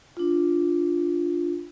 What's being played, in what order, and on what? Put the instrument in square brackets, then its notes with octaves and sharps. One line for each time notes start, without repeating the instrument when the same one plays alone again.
[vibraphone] D4 F4